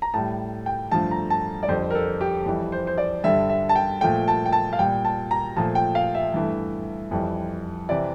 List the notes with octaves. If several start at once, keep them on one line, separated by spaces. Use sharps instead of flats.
A#5
A2 G3 A5
G5
G2 D3 F3 A3 A5
A#5
A5
D5
F2 D3 G3 C5
A#4
A4
G4
F2 E3 G3
C5
C5
D5
G2 D3 G3 E5
E5
A5
G5
A#2 F3 A3 G5
A5
G5
A5
F5
A#2 G3 G5
A5
A#5
A#2 F3 A3 A5
G5
F5
E5
G2 E3 A3
F2 E3 G3
C3 E3 D5